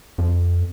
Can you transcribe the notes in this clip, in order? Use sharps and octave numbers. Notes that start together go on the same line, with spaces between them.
F2